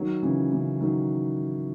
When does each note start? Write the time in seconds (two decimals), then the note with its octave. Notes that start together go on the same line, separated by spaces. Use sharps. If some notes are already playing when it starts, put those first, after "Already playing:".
Already playing: D#3 F#3
0.22 C#3 E3
0.52 C#3 E3
0.81 D#3 F#3